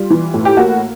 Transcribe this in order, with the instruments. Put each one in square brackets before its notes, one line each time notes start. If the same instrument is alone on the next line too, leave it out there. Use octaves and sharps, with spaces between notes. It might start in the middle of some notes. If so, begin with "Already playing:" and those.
Already playing: [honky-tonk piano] G3 F4
E3
A2
G4
A#3 F#4